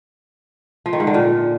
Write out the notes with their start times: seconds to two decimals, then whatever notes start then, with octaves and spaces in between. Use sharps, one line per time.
0.86 F3
0.93 D#3
1.00 G#2
1.07 D3
1.14 A#2